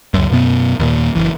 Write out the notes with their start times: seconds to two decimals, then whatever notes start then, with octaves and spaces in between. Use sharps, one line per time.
0.14 C#2 F#2
0.32 F#2 B2 B3
0.79 D#2 A#2
1.15 F#1 C2 E3